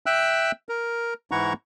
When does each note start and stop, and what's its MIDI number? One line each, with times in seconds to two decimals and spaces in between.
0.06 0.52 76
0.06 0.52 79
0.06 0.52 88
0.06 0.52 90
0.69 1.14 70
1.31 1.53 44
1.31 1.53 52
1.31 1.53 64
1.31 1.53 78
1.31 1.53 82
1.31 1.53 85